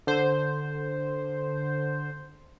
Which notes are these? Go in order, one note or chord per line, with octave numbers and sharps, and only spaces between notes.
D3 C5